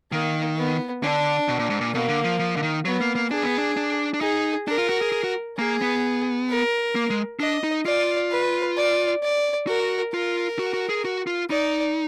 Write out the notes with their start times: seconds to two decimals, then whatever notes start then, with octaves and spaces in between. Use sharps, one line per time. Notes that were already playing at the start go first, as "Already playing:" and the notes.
0.11 D#3 A#3
0.58 B3
1.02 D3 D4
1.48 B2
1.59 A#2
1.70 G#2
1.81 A#2
1.94 B2 A#3
2.09 D3
2.24 F3
2.39 F3
2.56 D3
2.63 D#3
2.85 F#3 B3
3.01 A#3
3.15 A#3
3.30 D4 G#4
3.43 B3
3.58 D4
3.77 D4
4.14 D4
4.21 D#4 G#4
4.68 D4 A#4
4.78 F4
4.89 F#4
5.02 G#4
5.12 G#4
5.24 F#4
5.58 A#3 G#4
5.82 B3
6.50 A#4
6.95 A#3
7.10 G#3
7.40 D4 D#5
7.64 D#4
7.86 F4 D5
8.31 B4
8.77 D5
9.23 D5
9.67 F#4 A#4
10.13 F4 A#4
10.59 F#4
10.73 F#4
10.89 G#4
11.05 F#4
11.27 F4
11.50 D#4 D5